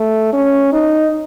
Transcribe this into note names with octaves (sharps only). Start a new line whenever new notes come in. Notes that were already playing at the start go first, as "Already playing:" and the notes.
Already playing: A3
C#4
D#4